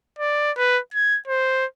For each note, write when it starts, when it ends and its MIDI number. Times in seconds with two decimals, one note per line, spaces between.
0.19 0.52 74
0.57 0.80 71
0.94 1.19 92
1.28 1.66 72